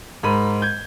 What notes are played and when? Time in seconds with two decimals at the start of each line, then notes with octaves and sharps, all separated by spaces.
0.23 G#2 A#4 B5 D#7
0.62 G6 G#6